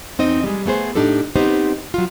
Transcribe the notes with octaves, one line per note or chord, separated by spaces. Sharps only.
E2 C4 D#4 D#5
G3 G#3
A3 B3 G#4 C5
A2 D4 D#4 G4 A4
B3 C4 D#4 G4 C5
F#3 F4